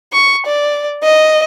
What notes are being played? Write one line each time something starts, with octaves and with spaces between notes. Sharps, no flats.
C#6
D5
D#5